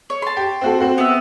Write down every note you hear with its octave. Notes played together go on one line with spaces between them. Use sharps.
C#5
A5 C6
G4
C4 F#4 A4
C4 F#4
B3 E5